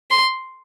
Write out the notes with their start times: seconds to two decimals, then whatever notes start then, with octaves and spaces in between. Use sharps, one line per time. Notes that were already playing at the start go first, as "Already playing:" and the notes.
0.11 C6